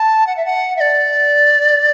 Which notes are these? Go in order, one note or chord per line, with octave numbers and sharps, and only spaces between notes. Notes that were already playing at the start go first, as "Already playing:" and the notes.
Already playing: A5
F#5
E5
F#5
E5
D5